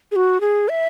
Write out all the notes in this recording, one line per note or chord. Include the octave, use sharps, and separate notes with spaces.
G#4
F#4
G#4
E5